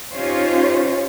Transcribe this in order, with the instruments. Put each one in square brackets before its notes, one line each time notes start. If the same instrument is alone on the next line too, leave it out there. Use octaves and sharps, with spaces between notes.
[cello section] C#4 D#4 F4 G4 C5 C#5